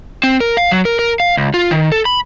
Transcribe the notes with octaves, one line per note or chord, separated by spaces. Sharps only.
C4
A#4
F5
F#3
A#4
A#4
F5
C#2
F4
D#3
A4
B5